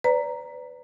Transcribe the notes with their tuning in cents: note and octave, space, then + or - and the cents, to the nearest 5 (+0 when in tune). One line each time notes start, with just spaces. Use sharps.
B4 +25 D5 -25 A#5 +0